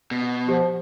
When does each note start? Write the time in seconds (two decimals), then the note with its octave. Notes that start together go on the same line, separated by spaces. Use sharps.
0.11 B2
0.48 F3 G4